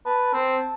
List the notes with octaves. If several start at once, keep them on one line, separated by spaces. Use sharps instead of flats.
B4 A5
C4